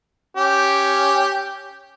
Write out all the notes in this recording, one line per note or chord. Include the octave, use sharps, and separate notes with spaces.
C#4 G4